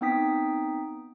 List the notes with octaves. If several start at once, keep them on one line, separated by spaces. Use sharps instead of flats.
B3 C4 D#4 G5 D#6 B6